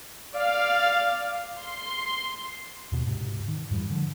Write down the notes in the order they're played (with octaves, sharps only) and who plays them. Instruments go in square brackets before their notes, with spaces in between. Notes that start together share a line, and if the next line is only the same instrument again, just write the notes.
[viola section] D5 F5
C6
[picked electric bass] D#2 B2
G#2 C3
D#3
F2 G#2 E3 G3
D3 F3